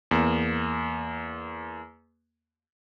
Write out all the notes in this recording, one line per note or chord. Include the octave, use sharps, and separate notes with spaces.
E2 A#3